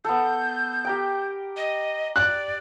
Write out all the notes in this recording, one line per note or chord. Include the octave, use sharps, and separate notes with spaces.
B3 A4 G6
G4 A#4 G5
D#5
D5 F#6